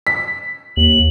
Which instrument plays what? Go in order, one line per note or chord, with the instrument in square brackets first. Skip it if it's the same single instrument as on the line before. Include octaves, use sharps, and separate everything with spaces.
[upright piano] B6
[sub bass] D#2 [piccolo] F#7